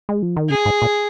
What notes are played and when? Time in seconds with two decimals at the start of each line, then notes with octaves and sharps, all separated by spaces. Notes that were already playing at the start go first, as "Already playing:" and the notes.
0.09 G#3
0.22 F3
0.36 D#3
0.50 C#3 G#4
0.66 G#2
0.82 A#2